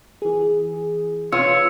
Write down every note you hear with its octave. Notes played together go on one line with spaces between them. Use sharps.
E3 G#4
F4 B4 C#5 E6